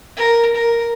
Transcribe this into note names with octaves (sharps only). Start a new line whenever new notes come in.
A#4
A#4